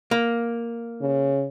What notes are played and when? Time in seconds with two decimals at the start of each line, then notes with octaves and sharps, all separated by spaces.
0.11 A#3
1.01 C#3